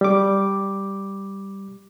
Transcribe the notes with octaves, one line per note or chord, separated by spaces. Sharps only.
G3 D6